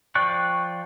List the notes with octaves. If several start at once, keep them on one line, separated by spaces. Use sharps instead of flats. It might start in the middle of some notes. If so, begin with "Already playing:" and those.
F3 D5 G5 C#6 F#6